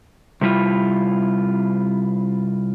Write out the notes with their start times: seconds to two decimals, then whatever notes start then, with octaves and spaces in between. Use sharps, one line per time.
0.41 C3 G3 E4 F4